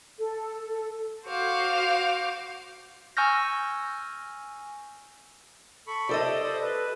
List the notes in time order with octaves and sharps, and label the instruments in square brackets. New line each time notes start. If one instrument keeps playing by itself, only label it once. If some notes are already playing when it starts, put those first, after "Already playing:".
[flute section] A4
[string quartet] F#4 C5 F5 D6
[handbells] G#5 C#6 E6 F6 G6 A#6
[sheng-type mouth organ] A4 B5 C#6
[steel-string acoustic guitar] G4 A4 D#5 [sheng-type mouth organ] C5 D5
[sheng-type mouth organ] C5 D5
B4